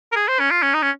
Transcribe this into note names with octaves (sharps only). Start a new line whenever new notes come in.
A#4
G#4
C5
C#4
F4
C#4
D#4
C#4